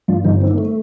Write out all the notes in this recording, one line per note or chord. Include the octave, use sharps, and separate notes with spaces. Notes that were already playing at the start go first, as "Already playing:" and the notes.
G2 F4
G1 D#4
D#3 C4
A#3
A3